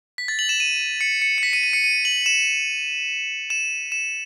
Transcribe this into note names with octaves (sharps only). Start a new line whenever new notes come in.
B6
A6
F#7
E7
D#7
C#7
C#7
C#7
B6
D#7
D#7
C#7
D#7
F#7
E7
E7
E7